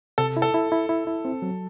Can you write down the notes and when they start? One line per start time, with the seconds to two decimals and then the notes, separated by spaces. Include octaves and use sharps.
0.18 C3 A4
0.37 E4
0.42 A4
0.54 E4
0.72 E4
0.89 E4
1.07 E4
1.25 C4
1.42 F#3